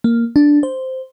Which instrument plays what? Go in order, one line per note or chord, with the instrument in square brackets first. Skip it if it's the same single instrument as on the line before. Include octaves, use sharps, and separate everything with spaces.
[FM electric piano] A#3
D4
C5